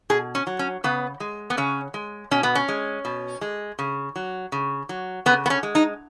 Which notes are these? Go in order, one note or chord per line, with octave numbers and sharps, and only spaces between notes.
B2 G#4
C#4
F#3
C#4
C#3 B3
G#3
B3
C#3 C#4
G#3
B2 C#4
B3
C#4
G#3
B2
G#3
C#3
F#3
C#3
F#3
C#3 B3
B3
C#4
G#3
D#4